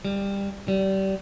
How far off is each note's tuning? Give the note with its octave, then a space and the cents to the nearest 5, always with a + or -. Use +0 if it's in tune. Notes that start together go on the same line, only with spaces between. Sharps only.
G3 +20
G3 -25